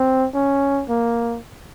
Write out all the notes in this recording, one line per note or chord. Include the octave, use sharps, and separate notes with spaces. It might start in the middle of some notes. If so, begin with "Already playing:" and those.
Already playing: C4
C#4
A#3